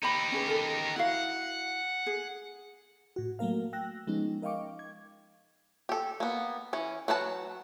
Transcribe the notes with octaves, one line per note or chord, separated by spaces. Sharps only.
D#4 G4 C5 B5
C#4 G#4 B4
A4 A#4
E4 F#4 F5 F#5
G#4
A2 F#4
F#3 A3 A#3 A#4 F5
G5 E6 F#6 A#6
F3 G#3 B3 C#4 D#4
A#4 D#5 F5 G5 C#6 D6
G#6
G4 A4
A#3 B3
E3 C#4
F#3 B4 F#5 A5